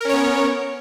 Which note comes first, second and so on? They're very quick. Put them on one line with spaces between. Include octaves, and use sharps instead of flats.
A#4 C#4 C#5 B3